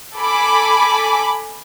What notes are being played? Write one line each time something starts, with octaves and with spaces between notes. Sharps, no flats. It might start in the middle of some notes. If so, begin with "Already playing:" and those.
A4 G#5 B5 D6